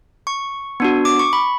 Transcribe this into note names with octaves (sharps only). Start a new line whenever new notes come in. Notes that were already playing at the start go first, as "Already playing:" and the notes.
C#6
B3 D4 F#4
D6
C#6
B5